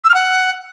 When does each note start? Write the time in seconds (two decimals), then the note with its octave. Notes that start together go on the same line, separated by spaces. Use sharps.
0.04 E6
0.09 F6
0.14 F#5